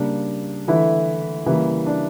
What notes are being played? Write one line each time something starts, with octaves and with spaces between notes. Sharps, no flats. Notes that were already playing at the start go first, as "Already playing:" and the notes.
Already playing: C#3 G3 A#3 D4
D3 E3 A3 E4
C#3 E3 G3 A#3 E4
D4